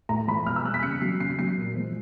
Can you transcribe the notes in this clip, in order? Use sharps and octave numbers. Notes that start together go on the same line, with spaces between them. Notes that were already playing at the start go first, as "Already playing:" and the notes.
A2 A#5
F3 G#3 B5
B2 F6
E6
G3 F#6
B6
C#3 C#7
F#3 C7
C#3 C7
F#3 C7
A#2
F3 G#3